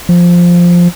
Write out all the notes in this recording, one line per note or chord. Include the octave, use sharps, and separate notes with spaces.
F3